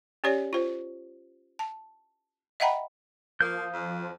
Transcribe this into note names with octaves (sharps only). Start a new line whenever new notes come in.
C#4 G4 C#5 D5
F4 C5
A5
D#5 E5 F#5 G5 A#5 B5
F3 A#3 F5 D#6 G6
F2